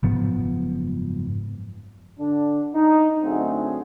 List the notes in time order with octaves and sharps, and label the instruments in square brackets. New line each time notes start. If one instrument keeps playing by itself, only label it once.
[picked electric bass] F#1 G#2 F3 B3
[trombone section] D3 D4
D#4
F#2 D3 A3 C4 F#4 G#4